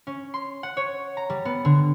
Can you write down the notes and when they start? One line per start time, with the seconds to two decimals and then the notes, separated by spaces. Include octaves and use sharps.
0.07 C#4
0.34 C6
0.63 F#5
0.77 C#5
1.17 A#5
1.30 G3
1.45 B3
1.65 D3